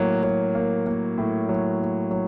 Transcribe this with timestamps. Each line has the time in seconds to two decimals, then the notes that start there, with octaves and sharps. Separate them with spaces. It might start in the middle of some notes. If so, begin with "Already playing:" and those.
Already playing: A2 F#3 A#3
0.23 F#3
0.55 A#3
0.87 A#3
1.18 A2
1.49 F#3
1.80 A#3
2.11 F#3